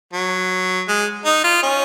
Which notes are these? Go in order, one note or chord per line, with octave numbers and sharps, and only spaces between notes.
F#3
G#3
D#4
F4
C#4